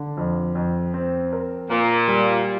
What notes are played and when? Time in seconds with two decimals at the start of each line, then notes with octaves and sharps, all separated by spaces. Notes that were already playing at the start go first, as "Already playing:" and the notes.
Already playing: D3
0.17 F2
0.55 F2
0.94 C4
1.32 A#4
1.70 A#2 A#4
2.08 G3